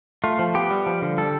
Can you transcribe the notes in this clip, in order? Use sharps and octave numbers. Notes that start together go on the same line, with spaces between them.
A3 F4
F3
B3 G4
G3
F3
D3
G3 A4